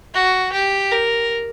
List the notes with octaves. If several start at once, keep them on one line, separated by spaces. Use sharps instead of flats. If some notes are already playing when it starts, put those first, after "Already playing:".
F#4
G4
A#4